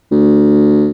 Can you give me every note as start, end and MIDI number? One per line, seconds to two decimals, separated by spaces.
0.11 0.91 38